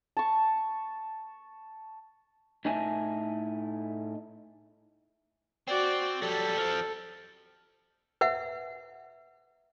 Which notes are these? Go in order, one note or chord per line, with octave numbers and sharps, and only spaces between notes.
A5 C#6
A2 A3 D#4 E4 G#5 A5
C4 F#4 D5
F#3 G3 A4
F3 C4
B4 E5 F#5